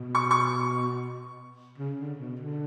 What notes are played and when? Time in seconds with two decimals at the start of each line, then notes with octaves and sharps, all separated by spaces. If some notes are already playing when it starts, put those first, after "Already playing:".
Already playing: B2
0.15 C#6
0.31 C#6
1.78 C#3
1.99 D3
2.19 B2
2.39 D3